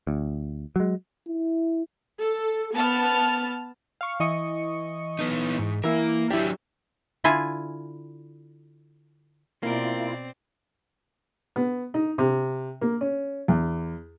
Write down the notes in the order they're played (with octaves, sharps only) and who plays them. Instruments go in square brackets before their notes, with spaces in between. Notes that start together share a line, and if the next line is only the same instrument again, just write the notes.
[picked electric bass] D2
F#3 G#3
[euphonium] E4
[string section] A4
B3 A5 F6
[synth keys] F5 C#6 C#7
E3 D#5 C#6
[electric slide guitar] B3 D#4
G#2
[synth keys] E3 E4 [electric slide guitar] A#3 A#4
[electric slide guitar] F#3 D4 [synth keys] E4 G4
[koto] D3 E4 F4 G#5
[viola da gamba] B2 D5 [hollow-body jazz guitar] A#3 A#4 [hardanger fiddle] C4 [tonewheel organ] E4 F4
[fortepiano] B3
D#4
C3
A#3
C#4
E2